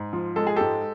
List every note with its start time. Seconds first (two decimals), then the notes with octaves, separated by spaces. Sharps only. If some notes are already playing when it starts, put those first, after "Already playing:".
Already playing: G#2
0.13 F3
0.36 G#3 A4
0.47 G#4
0.56 G#2 G4 A4